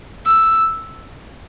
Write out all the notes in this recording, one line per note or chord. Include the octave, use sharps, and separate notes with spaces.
E6